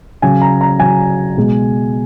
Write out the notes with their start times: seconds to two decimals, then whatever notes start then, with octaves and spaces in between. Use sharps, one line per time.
0.22 C#3 F#3 G#5
0.42 A#5
0.61 A#5
0.79 C#3 F#3 G#5
1.37 B2 G#3